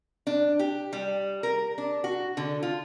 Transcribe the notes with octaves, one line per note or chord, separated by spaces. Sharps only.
D4
G4
G3
A#4
D4
F#4
D3
F4